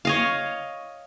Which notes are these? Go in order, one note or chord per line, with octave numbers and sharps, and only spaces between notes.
C#5 D#5 F5